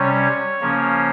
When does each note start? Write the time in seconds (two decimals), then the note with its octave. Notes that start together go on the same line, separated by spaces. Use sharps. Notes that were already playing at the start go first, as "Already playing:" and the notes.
Already playing: C3 G3 C#4 C#5
0.61 C#3 F3 A#3 C#4